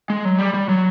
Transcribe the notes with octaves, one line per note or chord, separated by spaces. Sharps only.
G#3
F#3
G3
G3
F#3